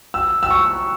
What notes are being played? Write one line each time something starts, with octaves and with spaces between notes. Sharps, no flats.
E6
E6
C#6